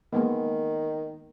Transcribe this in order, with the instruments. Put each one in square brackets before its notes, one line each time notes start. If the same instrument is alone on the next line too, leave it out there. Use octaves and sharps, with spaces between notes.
[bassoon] D#3 [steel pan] G#3 A#3 B3